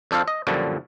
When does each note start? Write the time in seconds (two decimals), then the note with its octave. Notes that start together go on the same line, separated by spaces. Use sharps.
0.11 F2 D4 A4 C5 F5
0.28 D#5
0.47 F#2 A#2 D3 F3 G3